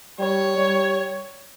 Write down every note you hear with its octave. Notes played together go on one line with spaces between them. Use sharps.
G3 C#5
G3